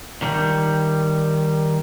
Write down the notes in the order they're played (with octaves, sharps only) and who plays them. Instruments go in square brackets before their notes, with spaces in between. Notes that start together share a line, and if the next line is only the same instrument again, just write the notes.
[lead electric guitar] D#3 G3